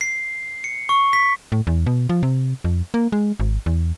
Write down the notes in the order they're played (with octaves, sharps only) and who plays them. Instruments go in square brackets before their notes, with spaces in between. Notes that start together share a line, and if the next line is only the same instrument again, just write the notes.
[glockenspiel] C7
C#7
C#6
B6
[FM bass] A2
E2
B2
F3
C3
F2
A#3
G#3
G#1
E2